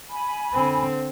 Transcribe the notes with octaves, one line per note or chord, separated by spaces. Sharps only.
G#5 B5
D3 C4